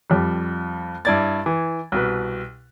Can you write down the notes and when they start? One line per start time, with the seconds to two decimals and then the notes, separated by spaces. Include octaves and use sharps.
0.10 F2 G3
1.05 G2 E4 D5 G#6 A6
1.46 E3
1.92 C2 B2 B4